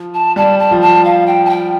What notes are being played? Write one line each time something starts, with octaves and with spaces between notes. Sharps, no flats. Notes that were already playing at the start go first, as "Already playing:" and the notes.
Already playing: F3
A5
G3 A5
A5
F3
A5
F5
G5
A5
G5